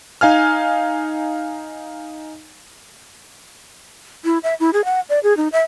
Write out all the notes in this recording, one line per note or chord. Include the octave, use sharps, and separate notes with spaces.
D#4 F5 G#5 F6
E4
E5
E4
G#4
F#5
D5
G#4
D#4
E5